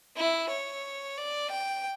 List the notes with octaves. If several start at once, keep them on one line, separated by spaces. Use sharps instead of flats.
E4
C#5
D5
G5